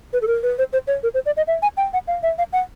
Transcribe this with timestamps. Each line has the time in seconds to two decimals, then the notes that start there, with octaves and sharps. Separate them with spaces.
0.13 B4
0.22 A4
0.27 A#4
0.43 B4
0.58 C5
0.73 C5
0.87 C#5
1.03 A#4
1.14 C5
1.26 D5
1.37 D#5
1.47 E5
1.62 G#5
1.77 G5
1.93 F#5
2.08 F5
2.23 E5
2.38 F5
2.53 F#5